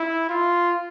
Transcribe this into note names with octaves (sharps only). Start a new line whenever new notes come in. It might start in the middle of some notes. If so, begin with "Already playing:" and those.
Already playing: E4
F4